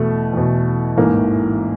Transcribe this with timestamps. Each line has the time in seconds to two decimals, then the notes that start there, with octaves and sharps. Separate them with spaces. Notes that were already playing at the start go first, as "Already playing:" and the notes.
Already playing: E2 B2 A3
0.33 E2 B2
0.97 A1 G#2 E3 A#3